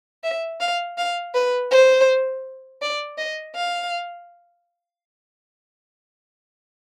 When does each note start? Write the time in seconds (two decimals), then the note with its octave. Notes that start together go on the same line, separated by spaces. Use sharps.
0.24 E5
0.60 F5
0.98 F5
1.34 B4
1.71 C5
2.82 D5
3.18 D#5
3.55 F5